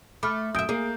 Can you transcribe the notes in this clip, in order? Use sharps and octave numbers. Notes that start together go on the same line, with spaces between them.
A3 B5 D6 F6
F#2 E5 D#6 G6 D7
A#3 G#4